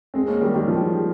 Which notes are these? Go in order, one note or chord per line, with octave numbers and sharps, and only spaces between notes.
G#3 C4
A#3 C#4
D#3 G3
D#3 G3
F3